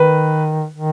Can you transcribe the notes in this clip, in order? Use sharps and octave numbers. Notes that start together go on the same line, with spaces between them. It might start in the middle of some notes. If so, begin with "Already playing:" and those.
Already playing: D#3 B4
D#3